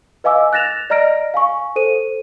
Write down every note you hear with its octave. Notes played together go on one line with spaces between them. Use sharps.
B4 D#5 F5 G#5 D6 E6
F#6 A6 A#6 E7 F7
D5 D#5 A#5 F6 A#6 D7
F5 G#5 C#6
A4 C5 D#7